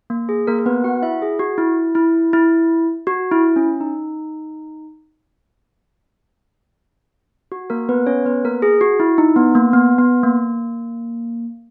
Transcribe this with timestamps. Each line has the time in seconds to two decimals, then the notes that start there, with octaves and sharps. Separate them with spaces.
0.10 A#3
0.29 G#4
0.47 A#3 A#4
0.59 A#4
0.66 B3 B4
0.84 F#4 F#5
1.02 E4 E5
1.22 G#4
1.39 F#4
1.58 E4
1.95 E4
2.33 E4
3.07 F#4
3.31 E4
3.56 C#4
3.80 D#4
7.52 F#4
7.70 A#3 A#4
7.89 B3 B4
8.07 C#4 C#5
8.25 B3 B4
8.45 A#3 A#4
8.62 G#4
8.81 F#4
9.00 E4
9.18 D#4
9.36 B3
9.55 A#3
9.73 B3
9.98 B3
10.23 A#3